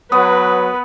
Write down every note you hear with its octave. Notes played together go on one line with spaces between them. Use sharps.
F#3 B3 B4 D#6